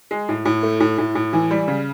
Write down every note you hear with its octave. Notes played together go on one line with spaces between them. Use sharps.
G#3
A2
A2
A3
A2
A2
A2
E3
G3
C#3